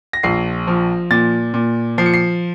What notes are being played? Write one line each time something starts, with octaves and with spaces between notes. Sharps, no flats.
A#6
A#1 C7
F3
A#2 A6
A#2
F3 C7
C#7
C7